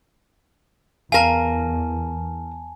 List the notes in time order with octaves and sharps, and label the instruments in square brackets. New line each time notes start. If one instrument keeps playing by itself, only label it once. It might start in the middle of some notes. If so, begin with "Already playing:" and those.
[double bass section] E2 [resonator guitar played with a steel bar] A#4 F5 [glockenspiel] G#5 A5